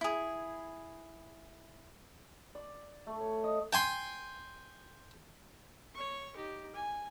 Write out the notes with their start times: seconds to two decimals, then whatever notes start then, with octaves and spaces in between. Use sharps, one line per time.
0.01 E4 G#4
2.55 D5
3.07 A3
3.21 C#5
3.44 D#5
3.73 G5 G#5 C6
5.95 C#5 C#6
6.36 D#4 G4
6.75 G#5